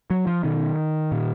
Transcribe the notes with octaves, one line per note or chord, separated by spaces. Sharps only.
F#3
F3
B2 D#3
A#2